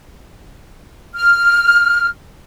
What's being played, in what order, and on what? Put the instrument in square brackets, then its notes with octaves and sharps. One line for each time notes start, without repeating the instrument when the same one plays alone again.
[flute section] F6